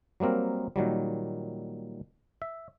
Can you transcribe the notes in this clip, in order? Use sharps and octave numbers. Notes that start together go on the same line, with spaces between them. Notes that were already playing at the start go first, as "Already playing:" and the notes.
F#3 G3 A#3 C4 A#4
A#2 D#3 F#3 G3
E5